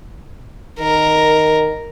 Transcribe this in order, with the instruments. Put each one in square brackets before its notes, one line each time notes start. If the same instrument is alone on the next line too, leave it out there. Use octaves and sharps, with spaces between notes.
[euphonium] D#3 [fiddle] A#4